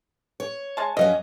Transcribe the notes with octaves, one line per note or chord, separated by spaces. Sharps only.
C#5
G#3 A5
F2 F#3 C#4 D#5